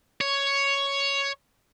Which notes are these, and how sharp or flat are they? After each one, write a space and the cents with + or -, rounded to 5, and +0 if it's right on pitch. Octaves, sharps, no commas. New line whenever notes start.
C#5 +5